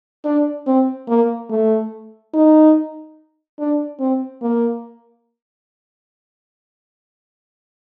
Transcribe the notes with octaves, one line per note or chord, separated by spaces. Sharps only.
D4
C4
A#3
A3
D#4
D4
C4
A#3